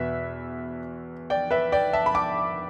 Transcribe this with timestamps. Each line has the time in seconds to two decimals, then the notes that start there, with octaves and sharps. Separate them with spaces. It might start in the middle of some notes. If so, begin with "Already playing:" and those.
Already playing: E2 B2 B4 E5
1.30 D5 G5
1.51 B4 E5
1.72 D5 G5
1.93 E5 A5
2.06 B5
2.15 A5 D6